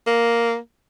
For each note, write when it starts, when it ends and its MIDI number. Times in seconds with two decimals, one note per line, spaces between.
0.07 0.57 58